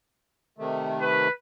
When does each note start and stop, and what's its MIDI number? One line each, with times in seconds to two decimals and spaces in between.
0.58 1.28 48
0.58 1.28 51
0.58 1.28 57
1.01 1.31 71